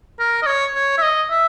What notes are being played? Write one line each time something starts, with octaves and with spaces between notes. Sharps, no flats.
A#4
D#5
C#5
C#5
E5
D#5
E5